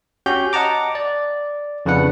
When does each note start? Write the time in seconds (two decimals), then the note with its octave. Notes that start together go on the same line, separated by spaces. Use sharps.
0.26 C#4 F#4 G4 G6
0.53 D#5 F#5 A5 A#5 D6
0.95 D5
1.86 F2 C#3 E3 D4 B4 F#5